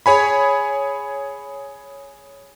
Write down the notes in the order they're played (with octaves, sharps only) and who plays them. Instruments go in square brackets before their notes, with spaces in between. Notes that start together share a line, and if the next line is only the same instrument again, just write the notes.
[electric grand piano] G#4 C#5 G#5 B5